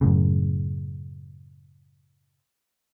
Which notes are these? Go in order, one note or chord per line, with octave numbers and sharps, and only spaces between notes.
F#2 A2 C#3